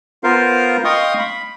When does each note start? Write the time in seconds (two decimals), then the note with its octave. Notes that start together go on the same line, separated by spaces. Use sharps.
0.24 B3 F4 A#4 C5 F5
0.84 D#5 F5 G5 C6 C#6 D#6
1.19 B5